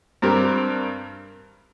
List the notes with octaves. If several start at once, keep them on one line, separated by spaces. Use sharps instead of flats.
G2 G3 C4 G4 A#4